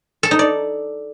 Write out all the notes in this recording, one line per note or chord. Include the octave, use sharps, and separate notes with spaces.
A4
D#4
D5